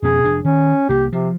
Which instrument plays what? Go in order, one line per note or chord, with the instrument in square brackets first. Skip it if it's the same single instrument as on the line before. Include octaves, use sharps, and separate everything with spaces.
[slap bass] F2 B2 C#4 [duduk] G#4
[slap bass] F1 D4
[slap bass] D#3 [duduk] C#4
[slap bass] C2 A#3 [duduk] G4
[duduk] C3 [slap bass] F3